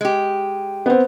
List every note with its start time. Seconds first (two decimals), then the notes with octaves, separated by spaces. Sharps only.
0.01 G#3 G4
0.86 B3 C4